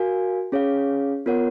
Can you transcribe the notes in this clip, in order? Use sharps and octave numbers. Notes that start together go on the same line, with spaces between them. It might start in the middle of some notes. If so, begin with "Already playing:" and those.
Already playing: F#4 A#4 F5 G#5
C#4 G#4 C#5 F5
B3 F4 A#4 C#5 F#5